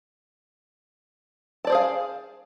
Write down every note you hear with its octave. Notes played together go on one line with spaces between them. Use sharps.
G#4 C5 D5 F5 A5